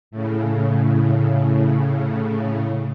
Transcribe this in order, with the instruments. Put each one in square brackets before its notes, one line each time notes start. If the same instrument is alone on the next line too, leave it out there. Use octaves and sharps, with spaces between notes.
[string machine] A2 C#3